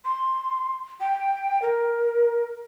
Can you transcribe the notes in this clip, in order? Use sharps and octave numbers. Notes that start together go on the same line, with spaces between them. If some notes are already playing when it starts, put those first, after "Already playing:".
C6
G5
A#4